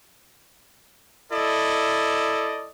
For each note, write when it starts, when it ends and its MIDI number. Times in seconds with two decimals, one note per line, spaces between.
1.32 2.71 64
1.32 2.71 69
1.32 2.71 74
1.32 2.71 75